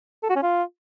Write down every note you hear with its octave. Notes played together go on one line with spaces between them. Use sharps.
A4
F#4
C#4
F4